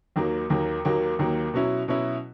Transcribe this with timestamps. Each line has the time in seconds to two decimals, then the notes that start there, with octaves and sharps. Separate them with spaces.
0.16 D#2 D#3 F#3 A#3
0.50 D#2 D#3 F#3 A#3
0.85 D#2 D#3 F#3 A#3
1.19 D#2 D#3 F#3 A#3
1.54 B2 F#3 C#4 E4
1.88 B2 F#3 C#4 E4